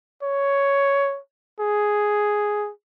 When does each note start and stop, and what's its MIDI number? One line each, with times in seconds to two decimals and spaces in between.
0.23 1.19 73
1.60 2.70 68